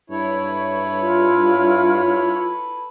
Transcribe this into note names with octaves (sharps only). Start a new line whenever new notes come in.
G2 E4 A4 B4 C#5
F4